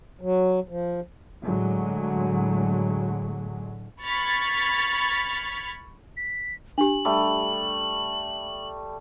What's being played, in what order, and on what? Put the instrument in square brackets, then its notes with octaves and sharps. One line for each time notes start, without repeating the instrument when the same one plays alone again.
[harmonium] F#3
F3
[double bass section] A2 D3 F#3 G#3
[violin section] B5 C#6 F6 G#6 A6 B6
[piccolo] B6
[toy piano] D4 G4 [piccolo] F#7
[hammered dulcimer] G3 A3